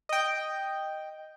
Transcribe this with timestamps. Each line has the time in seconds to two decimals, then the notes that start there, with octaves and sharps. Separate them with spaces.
0.09 D#5 G5